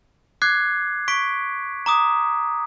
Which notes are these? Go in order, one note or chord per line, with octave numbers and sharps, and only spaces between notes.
D6 F#6 G#6 C7
C#6 B6 D7
A#5 D6 D#6